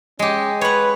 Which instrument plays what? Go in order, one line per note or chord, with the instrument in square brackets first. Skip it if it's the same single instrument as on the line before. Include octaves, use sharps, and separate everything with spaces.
[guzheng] G#3 G4 [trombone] C#4
[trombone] B4 [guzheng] C#5 F#5